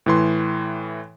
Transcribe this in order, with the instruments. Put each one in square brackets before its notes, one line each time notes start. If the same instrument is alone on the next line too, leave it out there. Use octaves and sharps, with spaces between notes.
[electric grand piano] A2 E3 C6